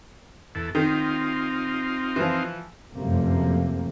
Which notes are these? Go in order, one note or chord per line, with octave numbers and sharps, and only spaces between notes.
E2 A4
D#3 C4 D#4 F4
E3 F3
F1 F#2 C3 F3 A3 A#3